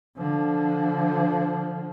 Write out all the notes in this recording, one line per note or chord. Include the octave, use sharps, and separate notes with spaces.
D3 F3